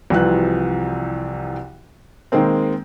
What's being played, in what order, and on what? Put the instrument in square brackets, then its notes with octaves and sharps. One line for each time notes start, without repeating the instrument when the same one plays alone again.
[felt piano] C2 C3 E3 F3 F#4 F#6
D#3 G#3 A#3 C4